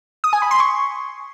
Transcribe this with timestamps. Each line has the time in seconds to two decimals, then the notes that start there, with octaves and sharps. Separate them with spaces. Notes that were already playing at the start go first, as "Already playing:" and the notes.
0.24 D#6
0.33 G#5
0.42 B5
0.51 C6
0.60 C#6